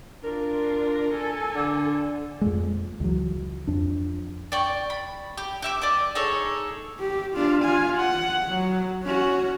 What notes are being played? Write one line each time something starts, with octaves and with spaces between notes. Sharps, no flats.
D4 F4 A#4
A4 G#5
D3
F2 A#2 G#3
C#2 E3 F#3
F2 D4
D5 G5 C#6
B5
G4
G4 E5 D6
D5 D#5 D6
D#4 G#4 A4 C#5
G4
D4 F4
F4 G#5
F#5
F#3
C#4 F#4